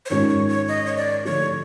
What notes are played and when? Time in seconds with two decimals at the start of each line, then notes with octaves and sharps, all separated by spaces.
0.06 C5
0.10 G#2 D#3 G#3 C#4 F4 C#5
0.29 C#5
0.49 C#5
0.68 D#5
0.86 C#5
0.96 D5
1.25 D3 F3 A3 D4 F4 C#5